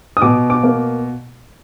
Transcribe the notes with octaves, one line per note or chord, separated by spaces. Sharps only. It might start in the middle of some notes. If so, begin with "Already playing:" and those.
D#6
B2 D6
D6
A#3